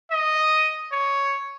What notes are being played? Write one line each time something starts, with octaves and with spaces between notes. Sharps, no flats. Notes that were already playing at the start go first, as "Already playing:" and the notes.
D#5
C#5